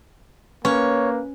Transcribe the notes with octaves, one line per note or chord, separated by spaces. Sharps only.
A#3 C#4 B4 C#5